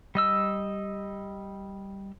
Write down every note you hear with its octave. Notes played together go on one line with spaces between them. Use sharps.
G3 D#5 E6